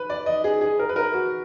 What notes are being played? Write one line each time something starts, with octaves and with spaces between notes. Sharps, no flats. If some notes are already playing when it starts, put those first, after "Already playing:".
Already playing: B4
D5
D#5
G#4
G#4
A#4
B4
A#4
F#4